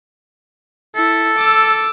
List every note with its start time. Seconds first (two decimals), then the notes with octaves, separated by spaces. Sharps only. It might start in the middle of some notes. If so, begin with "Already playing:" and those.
0.96 E4 A4
1.38 D6 E6